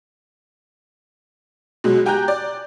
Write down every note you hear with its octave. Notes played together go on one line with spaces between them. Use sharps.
B2 F#3 G#3
G4 G5 G#5 A#5 F#6 G6
D5